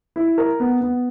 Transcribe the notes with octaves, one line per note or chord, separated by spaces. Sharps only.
E4
A#4
B3
B3